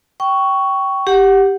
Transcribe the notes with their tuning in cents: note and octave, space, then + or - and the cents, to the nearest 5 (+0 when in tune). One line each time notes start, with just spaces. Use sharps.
G5 -15 C#6 +5
G4 +0 F#5 +0